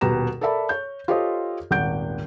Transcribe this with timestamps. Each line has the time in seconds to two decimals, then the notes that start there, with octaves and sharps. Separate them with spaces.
0.01 D#1 B2 G4 B4 A#5 E7
0.41 A4 A#4 D5 E5 A5 B5
0.69 C#5 G6
1.08 F4 G4 A4 C5 C#5 D#5
1.71 D#1 G#1 F#5 G6 D7